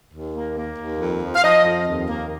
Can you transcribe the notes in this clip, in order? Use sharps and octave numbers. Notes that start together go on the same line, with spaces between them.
D#2
A#3
A#3
D#2
F2
F3
F5
F3 D#5
F2
D#2
A#3